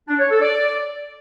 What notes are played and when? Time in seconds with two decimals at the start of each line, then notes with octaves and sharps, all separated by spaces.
0.08 D4
0.19 C#5
0.30 A4
0.42 D5